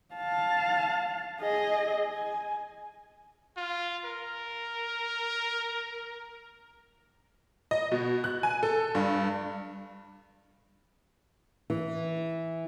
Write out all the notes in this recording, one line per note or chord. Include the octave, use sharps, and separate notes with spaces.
F5 A5
G#4 D#5
G#5
F4
A#4
D#5
B2
F#6
G#5
A4
G2
E3